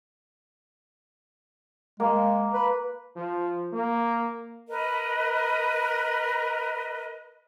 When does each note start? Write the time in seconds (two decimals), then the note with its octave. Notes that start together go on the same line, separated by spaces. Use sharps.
2.00 G#3 A#3
2.54 B4
3.15 F3
3.72 A#3
4.69 A#4 B4 D#5